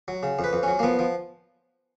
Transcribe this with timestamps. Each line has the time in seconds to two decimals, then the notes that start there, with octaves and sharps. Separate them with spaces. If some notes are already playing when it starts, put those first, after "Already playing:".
0.08 F#3
0.23 C#3
0.39 F2
0.44 B4
0.53 F2
0.63 F#3 C#4
0.79 A#3
0.83 F3 B3
0.99 F3